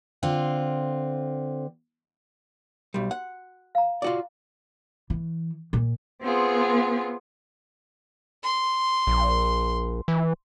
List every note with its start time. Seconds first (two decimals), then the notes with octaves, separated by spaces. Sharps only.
0.23 D3 C4 F4
2.94 B1 G3 F#4
3.11 F#5
3.75 F5 A#5
4.02 F4 F#4 D5
5.10 E3
5.73 A#2
6.22 B3 C4 F4 G#4
8.43 C6
9.07 A#1
10.08 E3